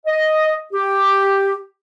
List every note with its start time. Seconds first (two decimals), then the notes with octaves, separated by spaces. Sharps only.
0.06 D#5
0.73 G4